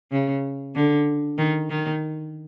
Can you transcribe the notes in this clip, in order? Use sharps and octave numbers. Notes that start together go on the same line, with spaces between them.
C#3
D3
D#3
D#3